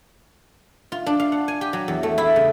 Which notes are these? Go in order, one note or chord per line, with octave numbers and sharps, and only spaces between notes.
F4
D4
F5
F#5
G#5
G4
F#3
E2
A3
E4
C#3